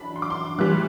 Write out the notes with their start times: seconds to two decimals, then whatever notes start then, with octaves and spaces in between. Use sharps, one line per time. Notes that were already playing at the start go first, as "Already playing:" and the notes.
Already playing: F#2 E3 D4 B5
0.16 C6
0.22 D6
0.30 C6
0.58 A2 E3 G3 F#6